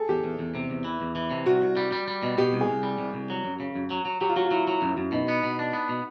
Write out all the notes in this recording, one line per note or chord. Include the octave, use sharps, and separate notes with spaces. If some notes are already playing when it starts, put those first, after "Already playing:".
Already playing: G#4 A4
E2 G4
E2
E2
C3
E2
E3
E2
E3
C3
C2 F#4
C2
G3
G3
G3
B2
B2 G4
C2
G#4
C2
G3
C2
C2
F#3
F#2
C#3
F#2
F#3
F#3
F#3 G4
F4
F#3 F#4
F4
F#3 E4
F#3
F#2
F#2
B2 D#4
B3
B2
D4
B3
B2